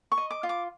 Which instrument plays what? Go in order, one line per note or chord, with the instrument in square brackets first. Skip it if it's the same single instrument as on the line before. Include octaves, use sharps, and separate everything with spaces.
[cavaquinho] C#6
D#5
D6
F4
D6